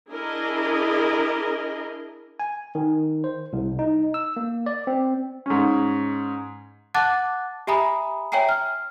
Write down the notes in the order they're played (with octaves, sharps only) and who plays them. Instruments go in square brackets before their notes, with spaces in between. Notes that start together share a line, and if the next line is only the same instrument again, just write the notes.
[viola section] D4 E4 G#4 A#4 D#5
[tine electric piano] G#5
D#3
C5
C2
D#4
E6
A#3
D5
C4
[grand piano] G#2 C#4
[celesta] F#5 A5 D6 F#6 A6
G4 E5 G#5 A#5 B5 D#6
C#5 E5 G5 G#5 A#5 C7
F6